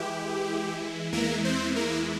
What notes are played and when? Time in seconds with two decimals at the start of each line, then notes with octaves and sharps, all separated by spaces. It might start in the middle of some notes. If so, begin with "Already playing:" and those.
Already playing: E3 G#3 E4 G4
1.12 E2 E3 G#3 A#3 E4 A#4
1.45 C4 C5
1.76 A#3 A#4